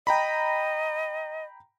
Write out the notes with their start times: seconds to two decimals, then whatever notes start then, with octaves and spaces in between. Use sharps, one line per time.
0.07 D#5 G5 A#5 B5